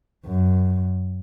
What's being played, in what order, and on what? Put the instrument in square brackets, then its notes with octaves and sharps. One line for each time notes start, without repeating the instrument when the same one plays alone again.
[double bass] F#2